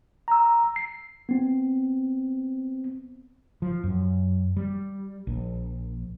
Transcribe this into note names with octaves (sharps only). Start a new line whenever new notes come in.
A#5 E6
C7
B3 C4
F3
F#2
G3
A#1